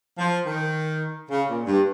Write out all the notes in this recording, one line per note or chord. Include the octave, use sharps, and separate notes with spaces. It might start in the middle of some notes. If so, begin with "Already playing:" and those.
F3
D#3
C#3
A#2
G2